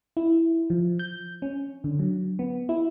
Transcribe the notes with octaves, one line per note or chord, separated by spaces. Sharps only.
E4
F3
G6
C#4
D3
F#3
B3
E4